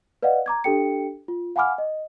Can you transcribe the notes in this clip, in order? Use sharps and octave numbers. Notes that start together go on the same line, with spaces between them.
B4 D5 D#5 F5 F#5
A#5 D6 G#6
D4 G4 A4 G5 C#7
F4
F5 F#5 G#5 B5 D6 F6
D#5